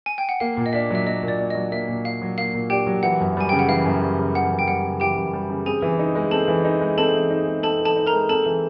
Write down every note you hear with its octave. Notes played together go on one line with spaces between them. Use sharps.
G#5
G5
F#5
A#3 F5
A#2
D#5
D4 E5
F#3 E5
A#3 D#5
A#2
D5
D4
F#3 D#5
A#3 E5
A#2
D4 F5
F#3
A#3 F5
A#2
D4 G4 G5
F#3
E3 F#5
F#2
G3 G#5
C#3 G5
F#5
E3 F5
F#2
G3
C#3
E3 F#5
F#2
G5
G3 F#5
C#3
E3 G4 G5
F#2
G3
C#3
C4 G#4 G#5
E3
D#4
G#3
C4 A4 A5
E3
D#4
G#3
C4 A4 A5
E3
D#4
G#3
C4 A4 A5
E3
A4 A5
D#4
A#4 A#5
G#3
C4 A4 A5
E3